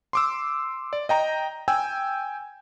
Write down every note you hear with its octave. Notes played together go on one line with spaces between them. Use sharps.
C6 D6 E6
D5
D#5 G5 A#5
G5 G#5 E6